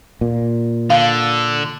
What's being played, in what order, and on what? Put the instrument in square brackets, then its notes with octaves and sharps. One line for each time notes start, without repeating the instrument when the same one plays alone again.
[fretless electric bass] A#2
[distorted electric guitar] D3 [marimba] F5